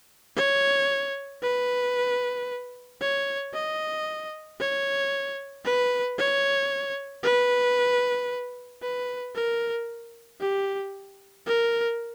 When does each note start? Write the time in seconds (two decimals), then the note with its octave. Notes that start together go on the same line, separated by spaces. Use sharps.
0.36 C#5
1.42 B4
3.01 C#5
3.53 D#5
4.59 C#5
5.65 B4
6.18 C#5
7.23 B4
8.82 B4
9.35 A#4
10.40 G4
11.46 A#4